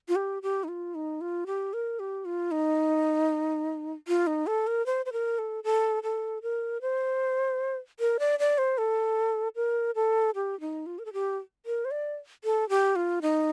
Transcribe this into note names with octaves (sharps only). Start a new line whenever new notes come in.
F4
G4
G4
D#4
F4
D#4
F4
G4
A#4
G4
F4
D#4
F4
D#4
A4
A#4
C5
C5
A#4
A4
A4
A4
A#4
C5
A#4
D5
D5
C5
A4
A#4
A4
G4
D#4
F4
A#4
A4
G4
A#4
C5
D5
A4
G4
F4
D#4